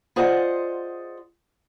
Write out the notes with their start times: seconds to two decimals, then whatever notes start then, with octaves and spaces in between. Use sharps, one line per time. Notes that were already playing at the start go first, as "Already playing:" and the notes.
0.16 F4 G#4 C5 D5 D#5 F#5